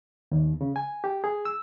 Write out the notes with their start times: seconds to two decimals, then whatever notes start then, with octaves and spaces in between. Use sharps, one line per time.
0.32 D#2
0.61 C#3
0.76 G#5
1.04 G4
1.24 G#4
1.45 E6